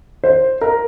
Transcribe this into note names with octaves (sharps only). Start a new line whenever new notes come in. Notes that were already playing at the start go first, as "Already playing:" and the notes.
C5
A#4